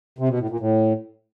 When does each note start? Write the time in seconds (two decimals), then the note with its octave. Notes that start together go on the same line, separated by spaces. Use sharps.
0.19 C3
0.29 B2
0.39 A2
0.50 A#2
0.60 A2